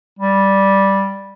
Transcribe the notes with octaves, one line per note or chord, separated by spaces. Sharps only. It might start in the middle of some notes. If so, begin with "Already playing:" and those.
G3